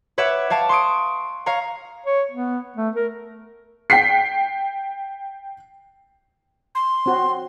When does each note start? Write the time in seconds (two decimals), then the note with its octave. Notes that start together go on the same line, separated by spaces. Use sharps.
0.18 B4 C#5 E5 F#5 D6 G#6
0.50 C#5 F5 A5 D6
0.69 C6 C#6 D#6 D7
1.46 C#5 F5 A#5 C#6
2.06 C#5
2.31 B3
2.76 A3
2.96 A#4
3.90 G5 B6 C7
6.75 C6
7.06 C4 F#4